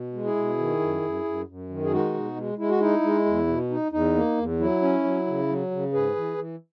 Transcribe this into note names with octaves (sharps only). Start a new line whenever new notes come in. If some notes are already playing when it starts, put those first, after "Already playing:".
Already playing: B2
G#3
E4 G#4
B2
D#3
F#2
F#2
F#2
F#2
D#3
G#4
G#3 D#4 F#4
B2
G#3
G#3 E4
F#4
D#4 E4
G#3
E2
B2
D#4
E2 D#4
A#3
E2
F#3 E4
C#4
F#3
C#3
F#3
C#3
G#2 G#4 B4
E3
E3